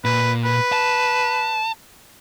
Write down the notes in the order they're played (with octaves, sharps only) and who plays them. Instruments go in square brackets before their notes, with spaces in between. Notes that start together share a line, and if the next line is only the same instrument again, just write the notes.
[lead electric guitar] A#2 [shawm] B4
[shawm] B4
[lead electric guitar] A5